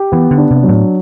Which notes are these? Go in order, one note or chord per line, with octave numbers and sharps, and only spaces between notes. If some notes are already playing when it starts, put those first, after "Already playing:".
Already playing: G4
E3 B3
D3
D4
C3
F#3
A2